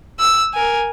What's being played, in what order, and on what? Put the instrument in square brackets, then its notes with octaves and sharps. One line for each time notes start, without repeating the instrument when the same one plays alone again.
[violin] E6
A#4 G#5